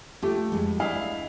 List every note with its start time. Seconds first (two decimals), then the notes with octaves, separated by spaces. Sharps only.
0.22 F3 A3 G4
0.52 F2 G#3
0.80 D2 D4 E4 D#5 F5